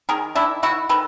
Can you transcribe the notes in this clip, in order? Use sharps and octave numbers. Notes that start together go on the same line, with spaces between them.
D#3 G#4 A#4
D#3 D4 E4
D#3 E4 F#4
D#3 A4 B4